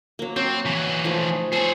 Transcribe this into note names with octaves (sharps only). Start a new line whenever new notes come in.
F#3 A#3
C4 F#4 C#5
E3 F#3
F3 A3 D#4
G#4 A4 C5 C#5